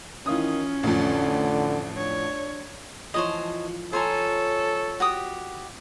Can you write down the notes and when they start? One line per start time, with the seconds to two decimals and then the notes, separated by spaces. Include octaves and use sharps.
0.26 D#3 E3 C#4 F4 D#6
0.83 A1 F2 D3
1.97 D4 C#5
3.14 E3 F3 C5 C#5 D#5 A5
3.68 F3
3.93 F4 A4 C5 C#5 F5 G#5 A#5
5.00 F#4 G4 D#6